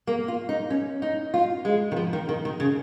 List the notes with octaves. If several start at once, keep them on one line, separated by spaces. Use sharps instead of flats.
A#3
F4
D#4
C#4
D#4
F4
G#3
D#3
F3
D#3
D#3
D#3
C#3